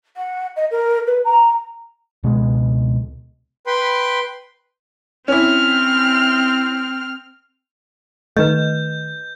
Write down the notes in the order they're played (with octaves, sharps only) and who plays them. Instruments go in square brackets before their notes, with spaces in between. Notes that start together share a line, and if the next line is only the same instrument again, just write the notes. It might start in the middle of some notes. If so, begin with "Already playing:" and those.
[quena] F#5
D#5
A#4
B4
A#5
[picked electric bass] C#2 B2 G#3 B3
[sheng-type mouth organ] B4 G5 B5 C6
[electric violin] C4 F6 [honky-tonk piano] C#4 E4
[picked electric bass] D#3 A3 [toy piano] B4 D#5 [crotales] G6